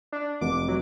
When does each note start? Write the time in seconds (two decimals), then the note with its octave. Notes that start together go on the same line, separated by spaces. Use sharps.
0.12 D4
0.41 F1 D6
0.68 F#3